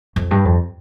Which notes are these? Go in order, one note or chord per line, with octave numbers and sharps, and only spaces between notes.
F2
G2
F2